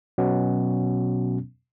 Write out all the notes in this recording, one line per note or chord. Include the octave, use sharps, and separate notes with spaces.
B2 F#3 B3 C#4